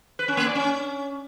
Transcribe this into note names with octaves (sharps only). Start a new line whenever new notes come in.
B4
C#4
A#3
D5
C#4